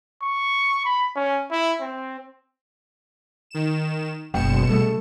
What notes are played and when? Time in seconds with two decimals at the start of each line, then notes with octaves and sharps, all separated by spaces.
0.22 C#6
0.85 B5
1.16 C#4
1.51 E4
1.81 C4
3.51 D#3 E7
4.34 F#1 B2 G5 C#7 E7
4.69 C#3 G3 A3 A4